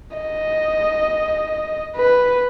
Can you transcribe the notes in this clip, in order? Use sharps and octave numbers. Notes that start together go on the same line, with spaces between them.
D#5
B4